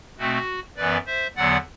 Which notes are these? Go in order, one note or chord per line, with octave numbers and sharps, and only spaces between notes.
B2 A3 C4 F#4
F#2 E3 B3 B4 D5
C5 E5
E2 D3 F#3 B3 D5 F#5